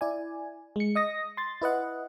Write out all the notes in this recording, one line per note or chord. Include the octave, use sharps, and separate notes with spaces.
E4 D5 G#5
G#3 C#7
D#5 D#6 A#6
C6 A6
E4 B4 D#5 F#5